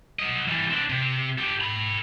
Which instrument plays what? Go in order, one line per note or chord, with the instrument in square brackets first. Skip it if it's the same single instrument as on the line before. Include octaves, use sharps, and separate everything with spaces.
[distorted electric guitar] F#3 D#5
E3 G3
C4 D4
C3
G4 A4
A4 B5